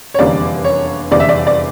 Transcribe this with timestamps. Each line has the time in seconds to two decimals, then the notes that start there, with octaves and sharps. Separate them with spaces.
0.14 C#5
0.19 F1 E2 D3 G3 A#3 D5
0.64 C#5
1.11 F1 E2 D3 G3 A#3 D5
1.20 E5
1.29 D5
1.47 D5